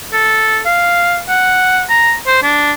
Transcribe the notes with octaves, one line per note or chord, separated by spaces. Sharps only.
A4
F5
F#5
A#5
C5
D4